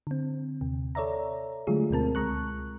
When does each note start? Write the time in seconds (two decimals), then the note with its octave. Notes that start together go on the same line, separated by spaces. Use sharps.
0.07 D3 C4
0.61 D#2 C3
0.95 A4 C#5 D5 E5 A#5
1.67 D3 F#3 G#3 A3 F4 G#4
1.90 D2 B2 C4 A#4 A5
2.15 C#2 G#3 A#5 C#6 F#6